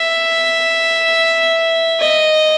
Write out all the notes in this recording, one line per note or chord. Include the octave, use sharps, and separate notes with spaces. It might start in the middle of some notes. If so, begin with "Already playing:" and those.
Already playing: E5
D#5